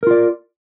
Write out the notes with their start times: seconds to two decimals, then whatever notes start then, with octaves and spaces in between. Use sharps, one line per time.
0.03 A#4
0.07 F4
0.11 D5